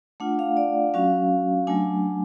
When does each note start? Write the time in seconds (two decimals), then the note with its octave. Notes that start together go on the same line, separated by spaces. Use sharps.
0.20 A3 D4 F4 F#5
0.39 F5
0.57 D5
0.94 F#3 C#4 F#4 F5
1.67 F#3 A3 D4 G#5